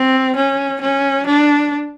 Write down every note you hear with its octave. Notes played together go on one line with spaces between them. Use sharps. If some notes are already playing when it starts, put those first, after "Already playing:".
Already playing: C4
C#4
C#4
D4